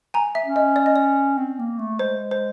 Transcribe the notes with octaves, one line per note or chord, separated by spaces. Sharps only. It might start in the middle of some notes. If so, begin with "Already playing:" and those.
G#5 A#5
E5
C#4
D#5
D5
D#5
D5
C4
A#3
A3
G#3 C5
C5